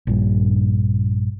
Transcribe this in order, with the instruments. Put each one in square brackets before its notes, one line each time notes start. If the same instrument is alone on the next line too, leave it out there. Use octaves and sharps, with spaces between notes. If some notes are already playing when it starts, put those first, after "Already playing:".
[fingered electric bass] A#1 G2